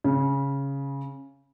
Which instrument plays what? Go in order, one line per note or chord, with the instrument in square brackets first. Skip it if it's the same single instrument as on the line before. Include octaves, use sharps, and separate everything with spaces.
[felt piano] C#3